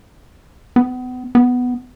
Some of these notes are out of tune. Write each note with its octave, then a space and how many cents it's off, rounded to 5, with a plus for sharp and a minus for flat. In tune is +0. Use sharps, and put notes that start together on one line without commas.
B3 +30
B3 +5